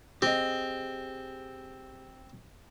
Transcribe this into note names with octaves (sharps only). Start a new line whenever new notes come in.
C4 G4 G#4 D#5